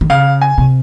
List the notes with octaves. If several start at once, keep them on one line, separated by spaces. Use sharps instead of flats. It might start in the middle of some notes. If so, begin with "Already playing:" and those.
D#3
C#3 F5
G#5
C3